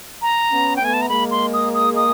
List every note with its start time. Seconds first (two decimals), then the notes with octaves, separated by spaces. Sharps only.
0.22 A#5
0.51 B3 C#4
0.76 G5
0.80 A3 B3 G#5
0.93 A5
1.02 A#5
1.09 G#3 A#3 B5
1.31 C6
1.53 D#6
1.74 D#6
1.96 D#6